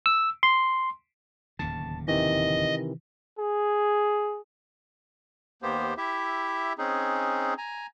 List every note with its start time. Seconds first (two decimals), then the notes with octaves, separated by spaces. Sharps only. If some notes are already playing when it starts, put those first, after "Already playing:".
0.06 E6
0.43 C6
1.59 D1 D#2 C#3 A5
2.08 C3 D#3 E3 D#5
3.39 G#4
5.62 D#2 A#3 B3 G4 C5
5.98 E4 G4 E5
6.78 C4 C#4 D#4 G#4
7.58 G#5 A#5